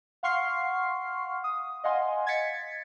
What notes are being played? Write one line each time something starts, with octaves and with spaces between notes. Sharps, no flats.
F5 F#5 C6 C#6 F6 C7
D#6
D#5 F5 F#5 G#5 C6
G#6 A6 B6 C#7